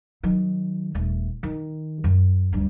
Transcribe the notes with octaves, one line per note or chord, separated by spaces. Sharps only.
D#3 F#3
D#1 A3
D#3
F#2
D2 G2